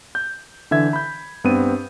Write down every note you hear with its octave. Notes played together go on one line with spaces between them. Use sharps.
G6
D3 E3 E5 G#6
B5 G6
G2 B3 C4 D#7